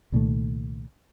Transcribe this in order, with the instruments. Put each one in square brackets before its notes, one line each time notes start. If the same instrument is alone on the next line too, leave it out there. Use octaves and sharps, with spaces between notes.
[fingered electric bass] C2 A#2 D#3 A3